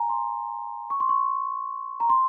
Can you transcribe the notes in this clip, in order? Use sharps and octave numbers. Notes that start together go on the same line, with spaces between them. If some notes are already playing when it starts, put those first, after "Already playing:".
Already playing: G#5 A#5
C6
C#6
C6
C#6
A#5
C6